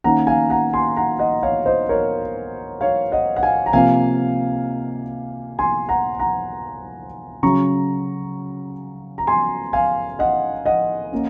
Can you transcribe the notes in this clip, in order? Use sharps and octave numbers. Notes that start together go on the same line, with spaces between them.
D#3 A#3 C#4 F#5 A#5
F5 G#5
F#5 A#5
G#5 C6
F#5 A#5
D#5 F#5
C#5 F5
C5 D#5
A#4 C#5
C#5 F5
D#5 F#5
F#5
F5 G#5
A#5
C3 F3 A#3 F5 G#5
G#5 C6
F#5 A#5
F#5 A#5
C#3 F#3 C#4 A#5 C#6
A#5
G#5 C6
F5 G#5
D#5 F#5
D#5 F#5
A#3 C#4